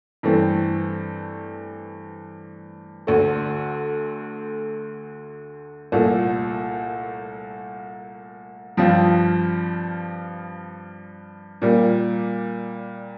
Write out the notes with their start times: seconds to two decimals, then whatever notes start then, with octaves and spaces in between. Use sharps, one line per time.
0.23 G2 E3 A3 C4
3.07 D2 D3 A3
5.92 C2 A#2 A3
8.77 G2 F3 C4 F4
11.62 A#2 G3 A#3